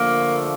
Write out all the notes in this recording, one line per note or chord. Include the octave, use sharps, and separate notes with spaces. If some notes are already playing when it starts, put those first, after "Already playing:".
Already playing: D3 F3 A3 A#3